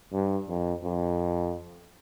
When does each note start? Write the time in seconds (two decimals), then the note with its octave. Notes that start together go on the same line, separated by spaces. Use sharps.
0.13 G2
0.49 F2
0.84 F2